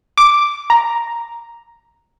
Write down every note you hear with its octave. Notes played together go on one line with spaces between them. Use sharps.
D6
A#5